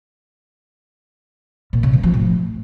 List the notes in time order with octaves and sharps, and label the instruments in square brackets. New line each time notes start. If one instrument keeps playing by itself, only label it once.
[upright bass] A#2
C#3
E3
F3
A2